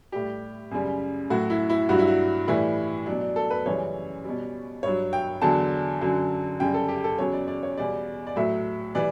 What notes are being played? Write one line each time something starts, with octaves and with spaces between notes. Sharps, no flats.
A2 G3 G4
F#2 C#3 G3
A2 F#3 F#4
E4
E4
G2 F#3 F#4
E4
F#4
A2 E3 G3 E4
B2 F#3 D4
D4
A4
B4
F#2 C#3 E3 G3 C#5
B2 G3
G2 F#3 C#5
G5
E2 D3 F#3 A5
F#2 D3 F#3
F#2 C#3 G3 G5
A4
G4
A4
E2 C#3 F#3 C#5
D5
D5
C#5
E2 B2 G3 D5
D5
A2 F#3 E5
E3 G3 D5